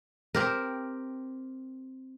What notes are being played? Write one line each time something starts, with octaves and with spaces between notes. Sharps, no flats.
C4 G4 A#4